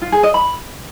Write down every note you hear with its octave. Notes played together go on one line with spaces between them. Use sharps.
F4
G#4
D#5
B5